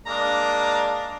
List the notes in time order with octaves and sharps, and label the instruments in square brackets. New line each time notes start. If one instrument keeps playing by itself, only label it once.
[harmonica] G#3 A#3 D4 [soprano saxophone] A#5